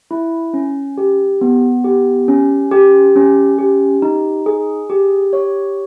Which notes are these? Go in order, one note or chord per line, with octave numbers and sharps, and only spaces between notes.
E4
C#4
G4
B3
G4
C#4
G4
C#4
G4
D#4
G#4
G4
C#5